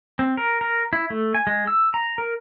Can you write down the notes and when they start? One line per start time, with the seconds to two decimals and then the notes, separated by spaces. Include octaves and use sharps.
0.19 C4
0.37 A#4
0.61 A#4
0.93 E4
1.10 A3
1.34 G#5
1.47 G#3
1.67 E6
1.94 A#5
2.18 A#4